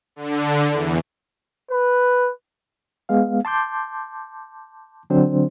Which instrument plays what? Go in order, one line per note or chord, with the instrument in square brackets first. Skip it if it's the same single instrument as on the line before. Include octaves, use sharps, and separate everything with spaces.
[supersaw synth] D3
E2
[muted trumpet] B4
[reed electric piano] G#3 B3 F5
A5 C6 D6 G6
D3 F#3 C4 D4 C5